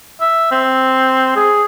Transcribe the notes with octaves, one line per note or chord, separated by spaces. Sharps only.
E5
C4
G#4